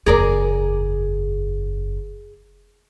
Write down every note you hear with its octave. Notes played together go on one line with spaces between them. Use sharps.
F#1 E2 G#4 A#4 D5